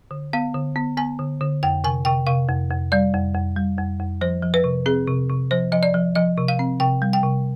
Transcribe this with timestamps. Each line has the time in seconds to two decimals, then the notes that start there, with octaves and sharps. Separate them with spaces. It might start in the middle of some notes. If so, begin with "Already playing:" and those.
0.11 D3
0.33 B3 F5
0.55 D3
0.76 B3
0.97 B3 G#5
1.19 D3
1.41 D3
1.63 F2 G5
1.84 C3 G#5
2.05 C3 G5
2.27 C3 F5
2.48 F2
2.71 F2
2.92 G3 D5
3.14 F2
3.35 F2
3.56 G3
3.78 F2
4.00 F2
4.21 F3 C5
4.42 F3
4.54 B4
4.64 C3
4.86 C4 G#4
5.07 C3
5.30 C3
5.51 F3 C5
5.72 F3 D#5
5.83 D5
5.94 F3
6.15 F3 D#5
6.37 C3
6.48 F5
6.59 C4
6.80 C3 G5
7.02 G3
7.13 G5
7.23 C3